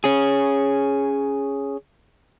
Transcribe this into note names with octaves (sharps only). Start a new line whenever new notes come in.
C#4 G#4